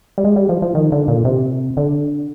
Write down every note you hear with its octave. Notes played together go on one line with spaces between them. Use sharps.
G3
G#3
G3
F3
F3
D#3
D3
A#2
C3
D3